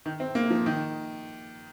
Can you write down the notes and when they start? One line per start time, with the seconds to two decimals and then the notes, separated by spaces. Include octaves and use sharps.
0.06 D#3
0.20 C4
0.35 A#3
0.50 F3
0.66 D#3